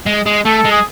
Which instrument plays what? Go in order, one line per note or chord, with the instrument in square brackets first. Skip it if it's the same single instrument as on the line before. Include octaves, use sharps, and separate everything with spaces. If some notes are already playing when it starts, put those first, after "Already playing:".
[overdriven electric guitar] G#3
G#3
[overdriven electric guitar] A3 [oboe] A4
[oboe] A4
[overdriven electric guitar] G#3
[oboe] G#4